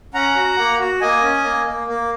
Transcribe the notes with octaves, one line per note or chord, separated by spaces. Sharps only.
C#4 F#5 A#5
F#4
A#3
F#4
A#3 D#5 G#5
C#4
A#3
A#3
A#3